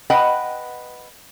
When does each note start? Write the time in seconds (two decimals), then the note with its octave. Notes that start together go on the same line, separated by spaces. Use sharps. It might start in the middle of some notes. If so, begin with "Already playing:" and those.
0.10 B4 D#5 F#5 G5